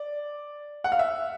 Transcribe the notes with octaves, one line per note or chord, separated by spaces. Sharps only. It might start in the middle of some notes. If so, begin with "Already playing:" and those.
Already playing: D5
F#5
F5
E5